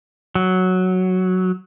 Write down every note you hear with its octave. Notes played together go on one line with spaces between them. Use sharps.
F#3